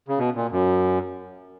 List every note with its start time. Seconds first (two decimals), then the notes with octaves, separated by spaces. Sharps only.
0.08 C#3
0.18 B2
0.35 A#2
0.52 F#2